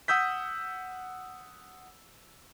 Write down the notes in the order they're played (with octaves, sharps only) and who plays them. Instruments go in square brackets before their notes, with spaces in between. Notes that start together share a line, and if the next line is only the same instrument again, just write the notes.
[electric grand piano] F#5 D#6 E6 G6 B6